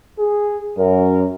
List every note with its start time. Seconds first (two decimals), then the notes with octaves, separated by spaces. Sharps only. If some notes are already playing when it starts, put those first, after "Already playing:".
0.19 G#4
0.78 F#2 A#4